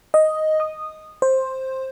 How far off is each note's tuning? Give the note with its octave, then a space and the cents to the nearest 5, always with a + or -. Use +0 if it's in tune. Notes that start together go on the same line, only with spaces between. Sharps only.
D#5 +5
D#6 -10
C5 +10